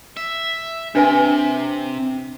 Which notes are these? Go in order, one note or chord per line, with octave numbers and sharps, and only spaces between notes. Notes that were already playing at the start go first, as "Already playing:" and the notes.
E5
C3 D4 B4 G#5